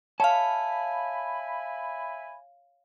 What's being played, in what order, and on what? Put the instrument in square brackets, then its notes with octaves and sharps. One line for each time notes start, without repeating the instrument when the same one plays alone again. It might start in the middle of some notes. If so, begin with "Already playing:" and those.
[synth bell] C#5 F5 [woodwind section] E5 G#5 B5 [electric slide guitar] A5